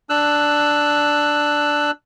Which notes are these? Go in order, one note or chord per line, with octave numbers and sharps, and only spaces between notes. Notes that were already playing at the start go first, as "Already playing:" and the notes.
D4 E6 F#6